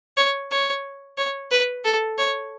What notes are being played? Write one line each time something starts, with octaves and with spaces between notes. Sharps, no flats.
C#5
C#5
C#5
B4
A4
C#5